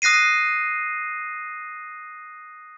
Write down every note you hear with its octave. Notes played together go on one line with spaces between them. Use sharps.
D#6 F#6 A#6 C7 D#7